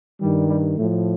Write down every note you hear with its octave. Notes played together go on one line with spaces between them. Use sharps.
G2 D#3 G3
G3
A2 F3 A3